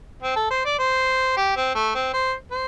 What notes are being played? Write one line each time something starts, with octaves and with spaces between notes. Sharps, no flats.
C4
A4
C5
D5
C5
G4
C4
A3
C4
C5
C5